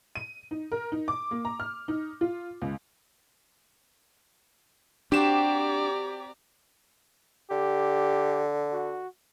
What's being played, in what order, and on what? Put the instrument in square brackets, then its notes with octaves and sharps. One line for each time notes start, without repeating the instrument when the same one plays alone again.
[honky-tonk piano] D#7
D#4
A#4
D#4
D6
A#3
A#5
F6
D#4
F4
C#2
[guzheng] C4 F#4 [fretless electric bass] D4 [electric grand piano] G4 E7 [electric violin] D5 A#5
[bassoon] D3 [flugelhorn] G4
[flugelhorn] F#4